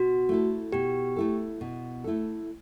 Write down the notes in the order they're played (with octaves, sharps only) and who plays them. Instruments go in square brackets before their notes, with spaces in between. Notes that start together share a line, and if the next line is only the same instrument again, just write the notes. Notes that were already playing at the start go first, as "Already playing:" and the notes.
Already playing: [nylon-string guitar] B2 [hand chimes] F#4
[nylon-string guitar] A3 E4 A4
[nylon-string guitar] B2 [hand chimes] G4
[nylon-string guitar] A3 E4 A4
B2
A3 E4 A4